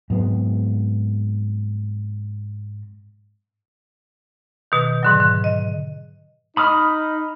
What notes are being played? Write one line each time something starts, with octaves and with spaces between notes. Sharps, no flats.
G#2 F#3 B3 C4
B2 D#3
G#2 D3 F#3
D3
D#5
D#4 B5 D#6 F6